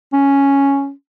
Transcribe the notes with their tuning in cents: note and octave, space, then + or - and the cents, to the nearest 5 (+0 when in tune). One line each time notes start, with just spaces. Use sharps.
C#4 +0